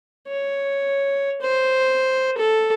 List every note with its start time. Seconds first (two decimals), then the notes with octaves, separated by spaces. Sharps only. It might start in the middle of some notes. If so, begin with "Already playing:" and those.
0.28 C#5
1.41 C5
2.38 A4